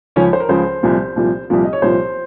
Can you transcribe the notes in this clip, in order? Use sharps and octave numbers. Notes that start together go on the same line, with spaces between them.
C#2 C#3 F3 C#4 C#5
C5
A#4
C#2 C#3 F3 C5
C2 A#2 F3
C2 A#2 F3
C2 A#2 F3
D#5
C#5
C2 A#2 F3 C5